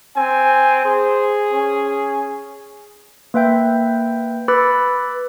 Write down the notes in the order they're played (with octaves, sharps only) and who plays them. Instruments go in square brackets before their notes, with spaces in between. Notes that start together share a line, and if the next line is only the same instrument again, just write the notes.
[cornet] C4 [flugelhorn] G#5
[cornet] G#4 [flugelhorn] C5
[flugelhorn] C#4
[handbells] A#3 B4 E5 G5 G6
B4 B5 D6 E6 A6